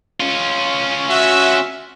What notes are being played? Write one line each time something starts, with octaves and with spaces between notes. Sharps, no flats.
C#4 F4
F#4 E5